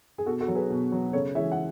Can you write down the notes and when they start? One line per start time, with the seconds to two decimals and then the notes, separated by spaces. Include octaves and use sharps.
0.18 G#4
0.26 B2 F#4 A4
0.40 F#4 A4
0.48 F#3
0.55 G#4 B4
0.70 B2
0.92 F#3
1.13 C#3 A4 C#5
1.35 E3 G#3 C#5 E5
1.52 F#5